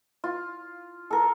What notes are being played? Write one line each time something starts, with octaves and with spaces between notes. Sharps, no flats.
F4
A4 A#4